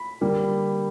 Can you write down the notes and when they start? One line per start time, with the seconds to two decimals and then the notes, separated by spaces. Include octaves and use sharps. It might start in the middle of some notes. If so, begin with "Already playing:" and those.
Already playing: B5
0.21 D3 G3 A#3